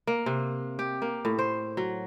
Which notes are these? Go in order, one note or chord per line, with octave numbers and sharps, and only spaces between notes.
A#3
C3
G4
A#3
A2
C5
F#3